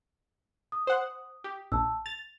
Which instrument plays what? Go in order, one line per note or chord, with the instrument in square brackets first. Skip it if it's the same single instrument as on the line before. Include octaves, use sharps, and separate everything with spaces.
[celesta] D#6
[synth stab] C5 F#5
G4
[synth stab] A#1 [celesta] A5 E6
[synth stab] A6 [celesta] F7